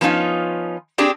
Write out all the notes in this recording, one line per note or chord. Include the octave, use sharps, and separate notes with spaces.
F3 B3 C#4 D#4 F4
C4 D4 G4 G#4